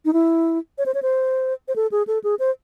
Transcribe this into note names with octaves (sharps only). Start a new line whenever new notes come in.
D#4
E4
C#5
C5
C#5
C5
C5
A4
G#4
A4
G#4
C5